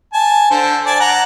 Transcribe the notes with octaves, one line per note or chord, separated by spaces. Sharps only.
G#5 A5
D3 C5
D5 G#5 A5
F#5 A5 A#5